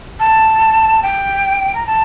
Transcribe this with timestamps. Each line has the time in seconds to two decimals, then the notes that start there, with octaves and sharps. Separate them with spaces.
0.19 A5
1.03 G5
1.75 A#5
1.87 A5